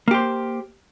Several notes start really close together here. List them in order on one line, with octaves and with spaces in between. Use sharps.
A#3 G4 C5